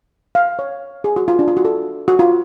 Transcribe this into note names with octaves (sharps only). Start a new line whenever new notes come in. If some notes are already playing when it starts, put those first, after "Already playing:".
F5
C#5
G#4
F#4
F4
D4
F4
F#4
A4
F#4
F4